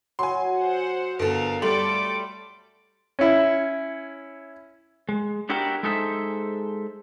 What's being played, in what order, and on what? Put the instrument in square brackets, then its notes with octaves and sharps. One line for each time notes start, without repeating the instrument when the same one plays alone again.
[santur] F#3 [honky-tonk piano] G#5 C6
[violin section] C5 F#5
[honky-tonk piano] G1 A4 [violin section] A#4 F5
[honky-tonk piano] G3 A3 F#7 [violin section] A4 D5 D6 [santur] C6
[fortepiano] C#4 E4
[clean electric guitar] G#3
B3 D4 E4 F#4 G4 A#4
G#3 D#4 G#4 A4 C5 E5